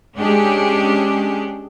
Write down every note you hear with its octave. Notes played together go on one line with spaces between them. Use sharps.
G#3 C#4 D4 G4 G#4